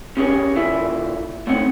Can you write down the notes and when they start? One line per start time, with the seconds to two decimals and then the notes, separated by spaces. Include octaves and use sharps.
0.17 C#4 G4 G#4 A#4 C#5 G#5
0.55 A#2 D3 E4 F4 E5
1.47 A3 C4 D#4 C#5 F#5